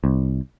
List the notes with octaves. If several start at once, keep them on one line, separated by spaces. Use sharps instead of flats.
C2